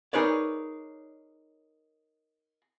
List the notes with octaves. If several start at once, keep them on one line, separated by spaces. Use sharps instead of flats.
D#4 G#4 A#4 B4 C#5 D5